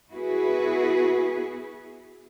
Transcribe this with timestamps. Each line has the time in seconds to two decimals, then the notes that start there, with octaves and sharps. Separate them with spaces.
0.11 B3 E4 F#4 G#4 B4